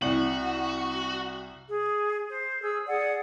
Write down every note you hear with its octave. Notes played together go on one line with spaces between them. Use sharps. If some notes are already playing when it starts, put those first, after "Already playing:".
C2 F#4 F#7
G#4
C5
G#4 E6
G#4 D5 F#5